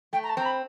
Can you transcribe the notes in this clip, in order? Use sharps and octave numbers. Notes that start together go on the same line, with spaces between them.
A3 G5
A#5
A5
C4 A#5
B5